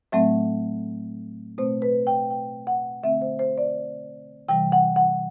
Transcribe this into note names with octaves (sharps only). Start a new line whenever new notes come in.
A2 F#3 A3 C4 E5
B2 A3 C4 C5
B4
G5
G5
F#5
D3 A3 C4 E5
C5
C5
D5
C3 E3 G3 G5
F#5
F#5